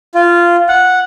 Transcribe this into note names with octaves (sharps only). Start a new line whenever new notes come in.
F4
F#5